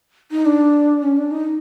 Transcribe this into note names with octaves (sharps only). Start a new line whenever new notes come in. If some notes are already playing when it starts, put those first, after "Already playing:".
D#4
D4
C#4
D4
D#4